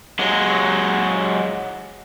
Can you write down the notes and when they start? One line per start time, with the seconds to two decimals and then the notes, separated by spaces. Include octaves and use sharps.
0.19 F#3 G#3